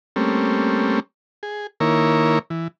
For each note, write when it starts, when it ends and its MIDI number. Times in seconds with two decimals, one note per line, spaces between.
0.16 1.00 55
0.16 1.00 57
0.16 1.00 58
0.16 1.00 60
0.16 1.00 61
1.43 1.67 68
1.80 2.39 51
1.80 2.39 58
1.80 2.39 64
1.80 2.39 70
1.80 2.39 73
2.50 2.68 52